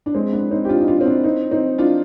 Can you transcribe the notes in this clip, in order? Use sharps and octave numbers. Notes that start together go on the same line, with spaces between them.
D4
G#3 C4
B3 D4
C4 D#4
G4
D4 F4
D#4
D4 F4
C4
B3 D4
C4 D#4
C4 D#4
D4 F4